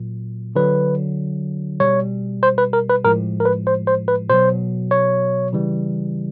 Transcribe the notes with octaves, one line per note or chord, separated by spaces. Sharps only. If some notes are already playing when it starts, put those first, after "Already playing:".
Already playing: A#2 F#3
D3 F#3 B4
B2 G3 C#5
C5
B4
A#4
B4
A2 F3 G#3 A#4
A#4
B4
C5
C5
B4
B2 F#3 C5
C#5
C#3 E3 G3